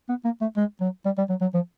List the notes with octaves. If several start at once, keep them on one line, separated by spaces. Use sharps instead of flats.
B3
A#3
A3
G#3
F#3
G3
G3
F#3
F#3
F3